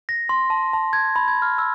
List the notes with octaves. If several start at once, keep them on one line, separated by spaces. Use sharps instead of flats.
A#6
C6
A5
A5
G#6
B5
G#6
F6
E6